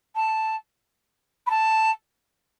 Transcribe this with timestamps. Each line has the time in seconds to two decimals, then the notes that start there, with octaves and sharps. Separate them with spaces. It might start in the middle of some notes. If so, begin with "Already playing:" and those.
0.15 A5
1.46 B5
1.50 A5